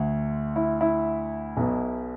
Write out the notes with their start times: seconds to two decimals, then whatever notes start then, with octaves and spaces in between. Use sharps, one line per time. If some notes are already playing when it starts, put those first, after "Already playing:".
Already playing: D2 D3
0.56 E4
0.81 E4
1.57 B1 B2